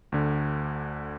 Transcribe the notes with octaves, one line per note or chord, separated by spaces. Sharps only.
D2 D3